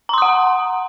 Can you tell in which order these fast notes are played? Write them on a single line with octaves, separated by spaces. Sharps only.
A#5 C6 D#6 F#5